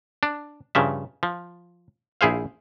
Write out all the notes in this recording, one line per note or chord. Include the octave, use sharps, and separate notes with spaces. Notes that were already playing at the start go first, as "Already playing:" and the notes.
D4
G2 C#3 F3 E5
F3
A#1 E4 G#4 C5 F5